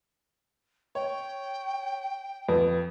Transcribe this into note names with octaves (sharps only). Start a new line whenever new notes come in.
C#5 G5
F2 B4